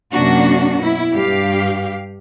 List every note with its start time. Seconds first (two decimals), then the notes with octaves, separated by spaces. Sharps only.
0.13 F#2 C3 A#3 C#4 D4 F#4
0.80 B2 E4
1.14 G2 G4 F5